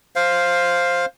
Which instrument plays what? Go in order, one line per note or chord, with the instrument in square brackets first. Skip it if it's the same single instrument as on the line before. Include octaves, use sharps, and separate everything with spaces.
[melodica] C5 F5